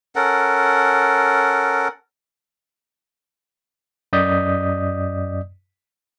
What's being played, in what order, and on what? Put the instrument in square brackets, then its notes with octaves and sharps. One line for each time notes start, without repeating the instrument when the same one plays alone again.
[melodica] C#4 A4 A#4 F#5
[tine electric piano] F#2 D5 D#5 D#6 G6 B6